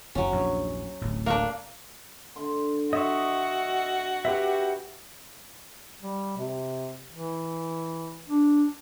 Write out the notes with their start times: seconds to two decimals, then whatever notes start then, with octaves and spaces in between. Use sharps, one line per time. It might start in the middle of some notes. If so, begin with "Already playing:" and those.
0.15 F#1 D#2 F#3 C#4
0.32 A#1 E2 G2
1.01 D1 A1
1.26 A#3 D4 A#5 C#6
2.36 D3 C6
2.93 F#4 D#5 E5 C#6
4.25 G4 B4 E5
6.02 G3
6.38 C3
7.13 E3
8.28 D4